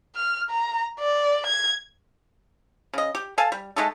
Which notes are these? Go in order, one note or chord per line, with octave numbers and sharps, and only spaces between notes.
F6
A#5
D5
G#6
C#3 D#5
G4
A4 F5 G#5 A5
G3
G#3 A3 D#4 A4